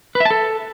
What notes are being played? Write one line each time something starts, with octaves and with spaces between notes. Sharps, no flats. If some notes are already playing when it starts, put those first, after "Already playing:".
B4
E5
A5
A4